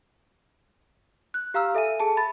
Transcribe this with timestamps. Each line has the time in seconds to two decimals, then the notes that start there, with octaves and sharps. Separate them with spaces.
1.34 F#6
1.54 G4 F5 A#5 E6 F6
1.75 A4 E5 G#5 D#7
2.00 G#4 A4 A5
2.17 B5 A6